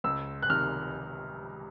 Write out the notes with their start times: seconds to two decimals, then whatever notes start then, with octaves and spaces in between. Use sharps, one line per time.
0.04 C#2 E6
0.43 F#6
0.49 C3 D#3 F6